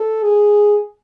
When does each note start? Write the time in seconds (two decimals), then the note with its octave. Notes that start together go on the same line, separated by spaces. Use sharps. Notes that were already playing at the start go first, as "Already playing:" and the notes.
Already playing: A4
0.24 G#4